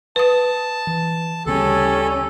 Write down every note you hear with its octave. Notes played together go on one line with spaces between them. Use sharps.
B4 A5 D#6
E3
D2 C#3 G3 C#4 A4